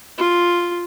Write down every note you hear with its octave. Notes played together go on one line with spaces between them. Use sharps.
F4